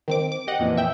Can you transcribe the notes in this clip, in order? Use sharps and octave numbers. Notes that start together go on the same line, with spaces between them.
D#3 C4 D6
D6
G4 D#5 F#5
F2 A#2 E3
E5 G5